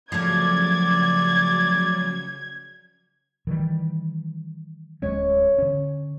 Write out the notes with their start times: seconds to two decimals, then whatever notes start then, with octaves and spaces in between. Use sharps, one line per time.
0.12 C#3 F3 F#3 A3 D5 G#6
3.47 D#3 E3 G3
5.02 D1 G#3 C#4 C#5
5.58 D3 C#4